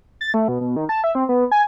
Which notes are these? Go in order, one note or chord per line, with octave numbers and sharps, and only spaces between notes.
A6
A3
B2
B2
D#3
A5
E5
C4
B3
G#5